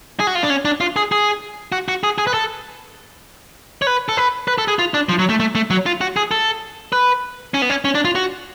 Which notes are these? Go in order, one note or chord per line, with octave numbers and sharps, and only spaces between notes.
G#4
F#4
F4
D4
C#4
D4
F4
G#4
G#4
F#4
F#4
G#4
G#4
B4
A4
C#5
B4
A4
B4
B4
A4
G#4
F4
D4
F3
F#3
A3
A3
A3
F#3
F4
F#4
G#4
A4
B4
C#4
B3
C#4
C#4
D4
F4
F#4